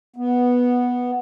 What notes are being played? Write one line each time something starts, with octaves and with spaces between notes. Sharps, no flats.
B3